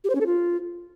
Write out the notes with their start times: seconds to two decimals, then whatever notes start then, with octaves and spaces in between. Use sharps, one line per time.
0.04 G4
0.10 C5
0.15 C#4
0.21 A4
0.26 F4